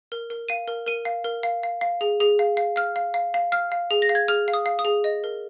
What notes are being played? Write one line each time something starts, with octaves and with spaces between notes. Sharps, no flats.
A#4
A#4
F5 D#7
A#4
A#4 D#7
F5
A#4
F5
F5
F5
G#4
G#4
F5
F5
F5 F6
F5
F5
F5
F5 F6
F5
G#4
A#6
F5
G#6
G#4 F6
F5
D#6
F5
D#6
G#4
D#5
A#4